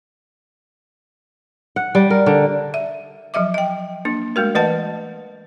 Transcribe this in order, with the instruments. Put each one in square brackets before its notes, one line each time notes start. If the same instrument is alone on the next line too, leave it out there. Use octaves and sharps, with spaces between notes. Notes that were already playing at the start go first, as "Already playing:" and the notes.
[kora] F#5
G3
A#4
D3
[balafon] E5
F3 F#3 D#5 E5 D6
D#5 G5
A#3 D4
G#3 A3 F#4 A#4
E3 A3 B4 D#5 F#5 A5